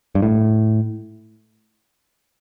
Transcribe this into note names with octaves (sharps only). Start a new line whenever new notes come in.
G2
A2